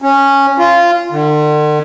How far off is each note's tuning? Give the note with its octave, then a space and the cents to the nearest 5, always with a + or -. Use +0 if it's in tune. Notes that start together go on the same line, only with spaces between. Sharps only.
C#4 -10
F4 -15
D3 +45